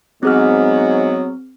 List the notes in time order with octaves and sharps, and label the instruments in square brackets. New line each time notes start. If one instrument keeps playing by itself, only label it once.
[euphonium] G#2 [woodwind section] F#3 B3 [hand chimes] C4 G#4 F6